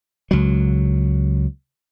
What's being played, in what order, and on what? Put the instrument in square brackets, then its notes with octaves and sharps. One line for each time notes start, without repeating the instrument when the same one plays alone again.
[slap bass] C#2 F#3